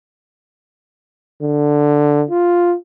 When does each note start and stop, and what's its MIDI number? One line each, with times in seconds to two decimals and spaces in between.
1.43 2.24 50
2.31 2.76 65